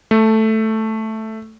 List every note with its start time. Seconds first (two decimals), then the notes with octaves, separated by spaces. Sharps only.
0.11 A3